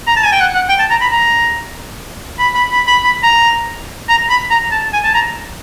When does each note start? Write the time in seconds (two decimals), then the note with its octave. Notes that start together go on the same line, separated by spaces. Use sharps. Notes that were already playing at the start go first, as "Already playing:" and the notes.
0.07 A#5
0.16 A5
0.24 G#5
0.32 G5
0.40 F#5
0.55 F#5
0.69 G5
0.79 A5
0.90 A#5
1.01 B5
1.12 A#5
2.39 B5
2.55 B5
2.71 B5
2.87 B5
3.04 B5
3.23 A#5
4.09 A#5
4.29 B5
4.50 A#5
4.72 A5
4.93 G#5
5.04 A5
5.14 A#5